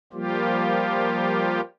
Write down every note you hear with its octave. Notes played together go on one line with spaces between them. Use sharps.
F3 G3 A#3 F4 G4